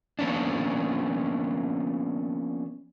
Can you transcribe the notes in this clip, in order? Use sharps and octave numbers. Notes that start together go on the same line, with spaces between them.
F3 A#3 B3 C#4 D4